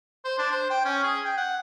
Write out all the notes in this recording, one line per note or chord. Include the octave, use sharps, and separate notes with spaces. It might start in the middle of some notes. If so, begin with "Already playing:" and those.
C5
D4
C5
G5
C#4
G#4
G5
F#5